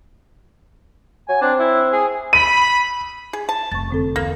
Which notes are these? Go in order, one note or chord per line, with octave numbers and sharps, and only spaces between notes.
F#3 G#5
C4 D4
E4
G#4
B5 D#7
G#4
A5
F1 F#2 C#6 A6
D3 C4 A4
E2 A#3